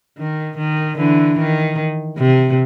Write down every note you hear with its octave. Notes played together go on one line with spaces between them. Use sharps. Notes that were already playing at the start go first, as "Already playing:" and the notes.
D#3
D#3
D3 E3
D#3
C3